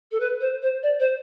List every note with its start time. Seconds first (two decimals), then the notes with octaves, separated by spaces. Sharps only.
0.11 A4
0.20 B4
0.40 C5
0.62 C5
0.82 D5
0.99 C5